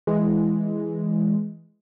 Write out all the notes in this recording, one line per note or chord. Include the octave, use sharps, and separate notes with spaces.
E3 G#3